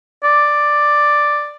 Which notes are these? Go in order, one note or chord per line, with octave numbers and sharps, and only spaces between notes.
D5